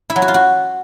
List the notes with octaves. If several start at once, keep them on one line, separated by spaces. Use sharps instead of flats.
E4
F#3
F#4
F4
F#4